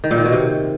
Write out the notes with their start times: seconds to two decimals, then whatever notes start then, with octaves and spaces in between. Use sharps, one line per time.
0.04 D#3
0.11 A#2
0.18 D#3
0.25 B2
0.32 C3